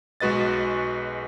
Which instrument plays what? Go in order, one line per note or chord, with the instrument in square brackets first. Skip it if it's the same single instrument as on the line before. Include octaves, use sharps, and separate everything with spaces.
[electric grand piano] B1 G#3 F#4 B4 D#5 A6